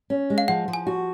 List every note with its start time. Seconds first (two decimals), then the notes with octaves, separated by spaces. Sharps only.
0.10 C#4
0.30 G#3
0.38 F5
0.48 F3 F#5
0.68 F3
0.73 G#5
0.87 F#4